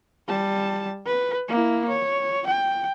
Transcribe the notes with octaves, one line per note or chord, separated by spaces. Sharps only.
G3 A5
B4
A#3 E4
C#5
G5